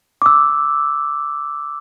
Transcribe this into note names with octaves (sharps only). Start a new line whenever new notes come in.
D6 E6